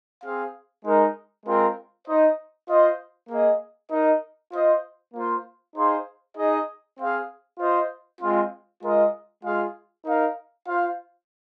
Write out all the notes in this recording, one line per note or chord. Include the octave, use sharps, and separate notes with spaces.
C4 G#4 F5
G#3 D#4 A#4
G#3 C4 F4 A#4
D#4 C5 D#5
F4 C5 D#5
A#3 G#4 D#5
D#4 A#4 D#5
F4 C5 D#5
A#3 F4 C5
D#4 G#4 C5 F5
D#4 G#4 D#5
C4 G#4 F5
F4 C5 D#5
G#3 C4 F4
G#3 F4 A#4 D#5
G#3 F4 G#4 F5
D#4 A#4 F5
F4 C5 F5